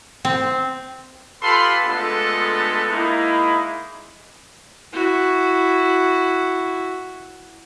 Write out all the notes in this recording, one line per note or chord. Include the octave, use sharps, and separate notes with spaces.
C4
F4 G4 A4 B4 B5 C6
G#3 A3 B3 D4 F4 A4
G#3 A#3 D#4 E4
E4 F#4